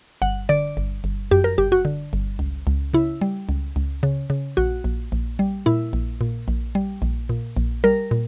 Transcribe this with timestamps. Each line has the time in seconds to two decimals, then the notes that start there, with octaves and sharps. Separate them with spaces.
0.22 G1 F#5
0.49 D3 D5
0.77 G1
1.04 G1
1.31 F#2 G4
1.44 A#4
1.58 G1 G4
1.72 F#4
1.85 D3
2.13 G1
2.39 C#2
2.67 C#2
2.94 C#3 E4
3.21 G3
3.49 C#2
3.76 C#2
4.03 C#3
4.30 C#3
4.57 A#1 F#4
4.84 A#1
5.12 A#1
5.39 G3
5.66 A#2 E4
5.93 A#1
6.21 A#2
6.48 A#1
6.75 G3
7.02 A#1
7.29 A#2
7.57 A#1
7.84 G3 A#4
8.11 A#2